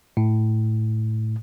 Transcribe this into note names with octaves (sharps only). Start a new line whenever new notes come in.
A2